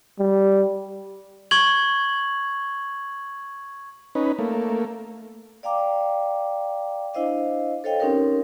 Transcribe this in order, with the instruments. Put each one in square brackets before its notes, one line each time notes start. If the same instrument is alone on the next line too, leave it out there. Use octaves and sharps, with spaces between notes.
[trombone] G3
[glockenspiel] C#6 G#6 F#7
[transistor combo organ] C#4 D#4 B4
A3 A#3
[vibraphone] D5 F5 G5 A#5 D6
D4 E4 C5 D#5 F5
A4 C5 C#5 D#5 F5 G5
C4 C#4 D#4 G4 A#4 C#5